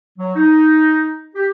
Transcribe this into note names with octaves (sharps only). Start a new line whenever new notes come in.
F#3
D#4
G4